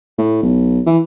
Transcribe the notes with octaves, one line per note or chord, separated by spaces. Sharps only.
A2
B1
E3